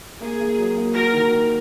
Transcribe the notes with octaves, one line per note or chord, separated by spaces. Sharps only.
A#3 G#4
A#3
F#3
A#3
F#4 A#4
D#3
A#4